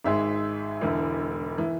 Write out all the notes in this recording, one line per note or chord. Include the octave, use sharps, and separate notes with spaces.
G#1 G#2 G#3 E5
E1 E2 D3
E3